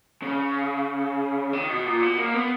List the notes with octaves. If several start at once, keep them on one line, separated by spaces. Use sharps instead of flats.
C#3
D#3
B2
A#2
B2
A#3
B3